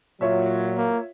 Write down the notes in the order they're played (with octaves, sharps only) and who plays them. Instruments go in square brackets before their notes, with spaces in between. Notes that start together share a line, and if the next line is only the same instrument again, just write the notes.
[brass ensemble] A#2 F#3 [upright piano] F4 C#5 E5
[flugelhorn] A#3